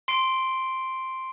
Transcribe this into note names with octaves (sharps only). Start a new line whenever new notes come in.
C6 C7 D7 G7